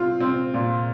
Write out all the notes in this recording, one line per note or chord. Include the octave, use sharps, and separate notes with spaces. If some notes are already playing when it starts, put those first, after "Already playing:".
Already playing: C4 F4
C4
A#2